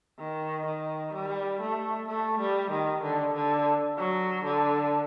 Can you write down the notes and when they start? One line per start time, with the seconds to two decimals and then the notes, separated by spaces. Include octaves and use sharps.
0.19 D#3
0.66 D#3
1.14 G3
1.61 A3
2.08 A3
2.40 G3
2.71 D#3
3.03 D3
3.34 D3
3.98 F#3
4.45 D3